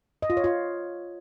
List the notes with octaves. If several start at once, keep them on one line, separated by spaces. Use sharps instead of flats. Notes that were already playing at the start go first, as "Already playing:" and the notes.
D#5
F4
C#5
F4